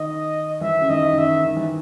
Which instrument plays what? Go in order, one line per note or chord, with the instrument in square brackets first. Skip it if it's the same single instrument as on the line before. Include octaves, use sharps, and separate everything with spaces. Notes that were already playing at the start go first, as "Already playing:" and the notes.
Already playing: [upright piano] D#3 [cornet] D#5
[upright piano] E3 [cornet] E5
[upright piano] C#3
[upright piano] D#3 [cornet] D#5
[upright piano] D#3
[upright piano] C#3 [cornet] E5
[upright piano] D#3
E3